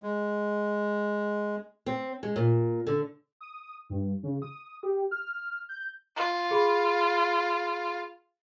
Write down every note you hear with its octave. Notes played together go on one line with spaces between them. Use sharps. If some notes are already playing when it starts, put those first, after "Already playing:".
G#3
C4
G#3
A#2
D3
D#6
G2
C#3
D#6
G4
F6
G6
F4
G#4 B5